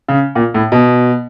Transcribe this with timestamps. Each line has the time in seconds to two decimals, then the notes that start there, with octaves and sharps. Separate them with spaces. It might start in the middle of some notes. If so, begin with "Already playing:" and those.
0.08 C#3
0.35 A#2
0.54 A2
0.72 B2